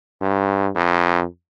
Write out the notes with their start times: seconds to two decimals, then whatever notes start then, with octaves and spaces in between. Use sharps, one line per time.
0.21 G2
0.75 F2